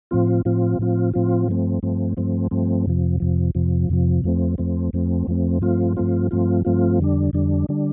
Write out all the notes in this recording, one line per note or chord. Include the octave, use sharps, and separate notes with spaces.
A2 F3 C4 F4
A2 F3 C4 F4
A2 F3 C4 F4
A2 F3 C4 F4
G2 F3 A3 C4
G2 F3 A3 C4
G2 F3 A3 C4
G2 F3 A3 C4
F2 C3 F3
F2 C3 F3
F2 C3 F3
F2 C3 F3
F2 F3 A3 C4
F2 F3 A3 C4
F2 F3 A3 C4
F2 F3 A3 C4
G2 F3 A3 C4 F4
G2 F3 A3 C4 F4
G2 F3 A3 C4 F4
G2 F3 A3 C4 F4
F2 D3 G3 D4
F2 D3 G3 D4
D3 G3 D4